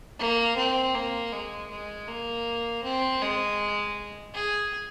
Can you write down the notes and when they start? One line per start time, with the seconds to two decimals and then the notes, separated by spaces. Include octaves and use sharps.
0.19 A#3
0.57 C4
0.95 A#3
1.33 G#3
1.70 G#3
2.09 A#3
2.84 C4
3.22 G#3
4.35 G#4